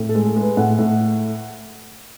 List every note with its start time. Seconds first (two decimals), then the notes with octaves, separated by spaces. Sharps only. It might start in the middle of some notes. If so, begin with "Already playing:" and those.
Already playing: A2
0.09 A4
0.15 G#3
0.26 A4
0.36 G#3 B4
0.57 A2 F#5
0.78 A2